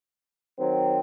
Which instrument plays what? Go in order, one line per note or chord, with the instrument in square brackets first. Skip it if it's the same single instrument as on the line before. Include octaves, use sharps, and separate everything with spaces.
[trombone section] D#3 F#3 C4